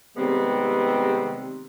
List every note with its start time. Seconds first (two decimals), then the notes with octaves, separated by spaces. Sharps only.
0.16 C3 D#3 G3 G#3 B3 C4